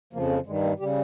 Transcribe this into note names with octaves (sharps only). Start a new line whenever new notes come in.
F2 C#3 F3 A#3
A#3
G2 D#3 G3 G#3
A#3
C#3 G3 G4